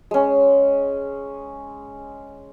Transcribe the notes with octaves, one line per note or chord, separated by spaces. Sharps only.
G#3 C#4